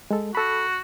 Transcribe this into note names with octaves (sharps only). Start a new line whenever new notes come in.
G#3 A4
F#4 A4 B5